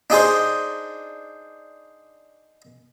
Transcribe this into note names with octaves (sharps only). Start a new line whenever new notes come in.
D4 D#4 G#4 C5